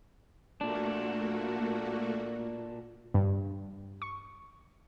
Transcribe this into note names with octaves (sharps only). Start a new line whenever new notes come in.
A#2 A3 A#3 D4 F#4
G2
C#6